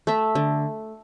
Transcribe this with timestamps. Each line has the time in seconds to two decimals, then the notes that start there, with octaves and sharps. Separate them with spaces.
0.07 A3 E5
0.35 D3